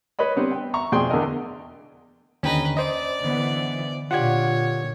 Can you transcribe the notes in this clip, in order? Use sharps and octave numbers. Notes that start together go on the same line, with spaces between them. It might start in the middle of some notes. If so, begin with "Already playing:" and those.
B4 C#5 D#5 B5
G3 B3 C4 D4
G5
E5 A#5 C#6
F2 B2 G#4 D5 G5 C6
E2 D3 B3 A4 A#4 D#5
D#2 D3 C#4 B4 D#5 G5 A#5
C5 D5 D#5
D3 E3 B3
A#2 D3 F4 G4 C#5 D5 F#5 G#6